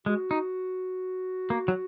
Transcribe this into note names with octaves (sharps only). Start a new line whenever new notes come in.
G#3 F#4
D#4
A#3
F#3